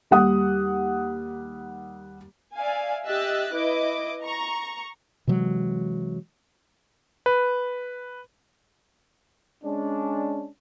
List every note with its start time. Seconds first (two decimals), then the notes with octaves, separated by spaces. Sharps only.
0.11 D#2 G3 F#5 D#6
2.55 D5 E5 F5 G#5
3.05 G4 D#5 E5 E6 F#6 A6
3.54 E4 B4 D#5 D6
4.24 A#5 C#6
5.27 C3 E3 F#3 G#3
7.26 B4
9.63 G#3 C#4 D4